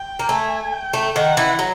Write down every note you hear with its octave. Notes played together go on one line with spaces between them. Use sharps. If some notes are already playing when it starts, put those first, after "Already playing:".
Already playing: G5
A#3
A3 G#5
G5
A3
D#3 F#5
E3
F#3